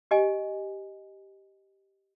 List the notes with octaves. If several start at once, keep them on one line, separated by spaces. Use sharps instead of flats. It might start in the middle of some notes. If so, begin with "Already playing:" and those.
G4 D#5 G#5